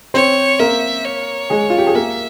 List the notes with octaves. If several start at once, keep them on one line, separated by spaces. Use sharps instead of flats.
C4 C5 C#5
A#3 A#4 E5
C#5
G#3 G#4
F4
G4
G#4
A#3 A#4 E5